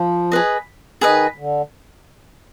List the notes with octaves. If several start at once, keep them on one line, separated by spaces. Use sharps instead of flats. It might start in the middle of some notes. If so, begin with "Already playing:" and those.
Already playing: F3
G#4 B4 D#5
D#3 G#4 B4 D#5
D3